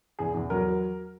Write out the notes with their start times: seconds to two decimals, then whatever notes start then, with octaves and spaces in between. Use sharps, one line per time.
0.19 E2 G#4
0.34 E2
0.50 F#3 A#4